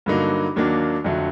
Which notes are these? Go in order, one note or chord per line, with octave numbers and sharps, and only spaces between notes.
G2 D3 F#3 A#3 D#4
D#2 D#3 F#3 A#3 D4
F2 D3 F#3 A3